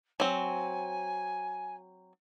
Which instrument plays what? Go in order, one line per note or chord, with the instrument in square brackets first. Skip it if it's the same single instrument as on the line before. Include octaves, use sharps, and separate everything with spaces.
[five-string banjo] F#3 C4 [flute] G#5